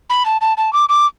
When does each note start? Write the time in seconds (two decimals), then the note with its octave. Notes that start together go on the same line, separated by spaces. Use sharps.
0.10 B5
0.26 A5
0.41 A5
0.57 A5
0.73 D6
0.89 D6